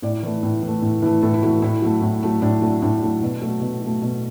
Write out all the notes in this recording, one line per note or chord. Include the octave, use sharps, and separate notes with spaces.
A2 D5
E3 A3
A2
E3 A3
A2
E3 A3
A2 A4
E4
E3 A3 F#4
A2 E4
F#3 A3
A2
F#3 A3
A2 D4
F#3 A3
A2 D4
F#3 A3
B2
F#3 A3
B2
F#3 A3
B2